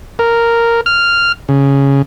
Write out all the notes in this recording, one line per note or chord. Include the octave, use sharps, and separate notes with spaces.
A#4
F6
C#3